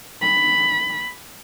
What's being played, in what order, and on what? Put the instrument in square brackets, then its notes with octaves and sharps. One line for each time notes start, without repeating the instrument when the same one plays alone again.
[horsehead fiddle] B5